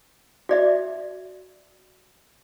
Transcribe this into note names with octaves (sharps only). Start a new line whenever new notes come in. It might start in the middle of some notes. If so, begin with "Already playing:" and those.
F#4 D5 E5